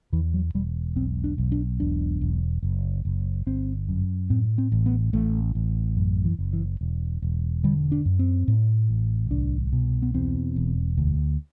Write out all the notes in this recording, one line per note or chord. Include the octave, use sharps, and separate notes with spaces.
E2 E3
F#3
E1 G3
B1 C4
D4
B1
D4
E1 D4
E1
F#1
F#1
G1 C4
F#2
A2 C4
C4
A1
B3
A1 A3
A1
F#2
E3
F#1
E3
E1
E1
D3 G3
D4
F#2
C4
A2
A1
C2 D4
B2
B3
E2 C4
E1
D2